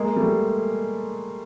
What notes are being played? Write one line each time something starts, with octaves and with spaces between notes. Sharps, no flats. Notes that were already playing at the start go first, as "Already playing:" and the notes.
Already playing: G#3 A#3
G3 A3